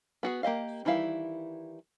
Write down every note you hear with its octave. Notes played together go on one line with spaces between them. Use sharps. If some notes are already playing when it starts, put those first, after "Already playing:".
B3 F#4 G#4
A#3 G4 D#5 F5
D#3 E3 G3 E4 F5